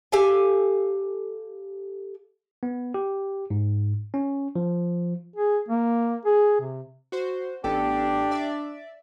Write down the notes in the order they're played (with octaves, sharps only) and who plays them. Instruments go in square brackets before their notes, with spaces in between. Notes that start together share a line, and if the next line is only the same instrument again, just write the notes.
[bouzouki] G4 A4 F5 G#5
[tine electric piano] B3
G4
G#2
C#4
F3
[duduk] G#4
A#3
G#4
C3
[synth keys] F#4 C5
[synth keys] A1 B3 A4 [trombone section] D4 [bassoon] G4
[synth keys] D5 E5